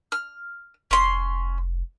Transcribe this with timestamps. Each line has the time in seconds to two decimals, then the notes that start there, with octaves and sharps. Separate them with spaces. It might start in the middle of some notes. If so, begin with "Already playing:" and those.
0.12 F6
0.91 F1 C#4 C6